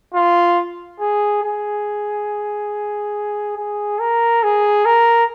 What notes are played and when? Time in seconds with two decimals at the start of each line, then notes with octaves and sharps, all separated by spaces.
0.14 F4
1.00 G#4
1.43 G#4
3.57 G#4
4.00 A#4
4.43 G#4
4.85 A#4